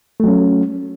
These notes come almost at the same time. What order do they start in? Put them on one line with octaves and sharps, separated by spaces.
A3 F#3 C#4